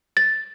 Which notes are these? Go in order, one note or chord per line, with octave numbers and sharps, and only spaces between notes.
A6